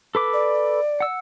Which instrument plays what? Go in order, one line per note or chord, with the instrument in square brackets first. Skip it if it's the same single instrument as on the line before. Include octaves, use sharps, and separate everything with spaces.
[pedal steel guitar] A4 B4 D6
[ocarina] D5
[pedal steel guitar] F#5 E6